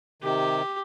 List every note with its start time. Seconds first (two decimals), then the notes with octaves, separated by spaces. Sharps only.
0.22 C3 D#3 G4